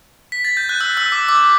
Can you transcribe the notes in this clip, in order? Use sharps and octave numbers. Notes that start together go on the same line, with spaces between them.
B6
A6
G6
F#6
E6
E6
D6
D6